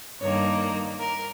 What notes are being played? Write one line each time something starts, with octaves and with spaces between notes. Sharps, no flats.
G2 D#3 A#3 C#5
A#4